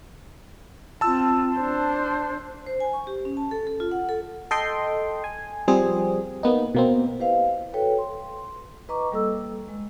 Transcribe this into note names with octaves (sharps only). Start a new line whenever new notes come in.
C4 F4 A5 E6
D4 C5
C5
G#5
C#6
G4
C#4
A5
A4
A4
F4
F#5
A4
A4 D#5 G5 C6
G#5
F3 G3 C4 G#4
A#3 B3 D#4
B2 A#3 C4
E4 G4 B4 C5 D#5 F5
F#4 A4 B4 C#5 G5
C6
E4 B4 D#5 A#5 C#6 D6
G3 A#3 A4 D#5 E6
G#3